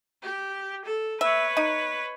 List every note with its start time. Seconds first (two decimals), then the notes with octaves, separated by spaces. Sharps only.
0.22 G4
0.85 A4
1.21 B4 C#5 E5
1.57 D#4